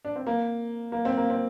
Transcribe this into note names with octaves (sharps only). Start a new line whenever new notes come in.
D4
C4
A#3
A#3
C4
A#3
C4